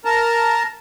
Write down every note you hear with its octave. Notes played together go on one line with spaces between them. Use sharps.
A#4 A5 A#5